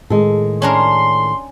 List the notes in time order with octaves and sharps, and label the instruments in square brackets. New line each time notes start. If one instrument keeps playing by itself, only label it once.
[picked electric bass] A2 D#3 [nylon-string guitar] G#3 A4
[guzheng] C#4 D4 A#4 [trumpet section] C6